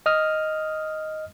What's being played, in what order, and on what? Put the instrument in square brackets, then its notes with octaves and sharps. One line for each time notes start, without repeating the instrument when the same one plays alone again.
[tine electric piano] D#5 D#6 F6